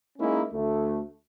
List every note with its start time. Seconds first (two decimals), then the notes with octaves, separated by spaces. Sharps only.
0.19 G#3 A#3 C#4 D#4 E4
0.52 D2 A3